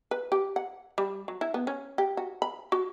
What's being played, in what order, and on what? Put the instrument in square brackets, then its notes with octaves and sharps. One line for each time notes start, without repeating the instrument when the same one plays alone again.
[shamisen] B4
G4
F#5
G3
F#3
E4
B3
C#4
G4
F#4
B5
F#4